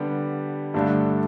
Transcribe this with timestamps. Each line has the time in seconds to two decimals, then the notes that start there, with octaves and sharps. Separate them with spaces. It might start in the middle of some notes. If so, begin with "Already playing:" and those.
Already playing: D3 G3 B3 D4 G4
0.74 G2 D3 A3 D4